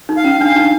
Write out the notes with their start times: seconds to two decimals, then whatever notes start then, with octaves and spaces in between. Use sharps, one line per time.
0.09 D#4
0.17 F5
0.24 C#4
0.40 D4 F5
0.56 D#4